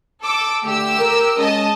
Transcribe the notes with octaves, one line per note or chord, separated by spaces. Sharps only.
A4 D6 E6
D3 A3 G4 E6
A#4
G#3 C#4 D#5 A5